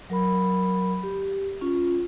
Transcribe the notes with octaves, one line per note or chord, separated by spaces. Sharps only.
F#3 A#4 B5
G4
C#4 F4